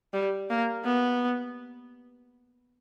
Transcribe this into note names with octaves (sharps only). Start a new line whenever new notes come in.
G3
A#3
B3